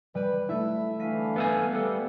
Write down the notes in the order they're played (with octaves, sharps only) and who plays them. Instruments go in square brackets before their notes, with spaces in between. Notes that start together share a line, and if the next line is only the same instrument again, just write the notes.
[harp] G3 [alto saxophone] B4
[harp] A3 E4 [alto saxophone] E5
[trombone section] D3 E3 A3 [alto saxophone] F5 [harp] B6 D#7
[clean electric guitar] B3 A4 G#5 [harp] E5
[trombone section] G3 [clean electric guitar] B3 A4 [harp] F#6